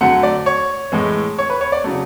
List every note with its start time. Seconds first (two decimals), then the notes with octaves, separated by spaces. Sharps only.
0.01 D3 F#3 A3 F#5
0.23 D5
0.46 C#5
0.92 A2 E3 G#3
1.39 C#5
1.50 B4
1.61 C#5
1.72 D5
1.84 C#3 F#3 A3